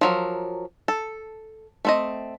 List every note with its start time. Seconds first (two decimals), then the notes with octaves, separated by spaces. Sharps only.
0.01 F3 F#3 A#4
0.88 A4
1.85 A3 C4 D#5